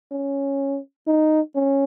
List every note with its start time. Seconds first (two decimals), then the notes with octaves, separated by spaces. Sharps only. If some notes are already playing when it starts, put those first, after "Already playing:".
0.11 C#4
1.07 D#4
1.55 C#4